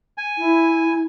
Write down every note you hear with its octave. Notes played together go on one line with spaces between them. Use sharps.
G#5
E4